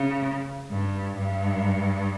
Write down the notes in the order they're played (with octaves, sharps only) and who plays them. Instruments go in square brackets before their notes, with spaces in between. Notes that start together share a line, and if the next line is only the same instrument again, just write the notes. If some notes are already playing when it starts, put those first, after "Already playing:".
Already playing: [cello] C#3
G2
G2